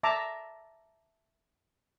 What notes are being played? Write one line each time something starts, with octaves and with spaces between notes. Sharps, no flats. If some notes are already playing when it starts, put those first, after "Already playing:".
E5 A5 A#5 D6